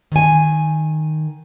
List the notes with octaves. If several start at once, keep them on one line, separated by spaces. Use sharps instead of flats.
D#3 G#5